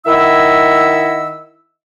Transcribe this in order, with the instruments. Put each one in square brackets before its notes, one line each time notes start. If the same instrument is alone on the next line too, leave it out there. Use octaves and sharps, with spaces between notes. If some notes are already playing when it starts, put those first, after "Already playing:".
[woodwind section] D#3 E4 D#5 E5 F#5 E6